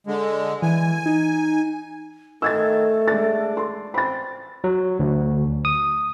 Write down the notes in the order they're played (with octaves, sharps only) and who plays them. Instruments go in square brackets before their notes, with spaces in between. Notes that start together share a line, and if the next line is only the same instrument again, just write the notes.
[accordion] D3 G#3
[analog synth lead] E3 [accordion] G#5
[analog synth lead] D#4
[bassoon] D#3 [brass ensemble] A3 [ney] A4 [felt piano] E6 G#6 A6
[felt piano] G#3 A6 [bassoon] D4
[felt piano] C6
[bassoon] C4 [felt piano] B5 A6
[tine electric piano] F#3
D2
D#6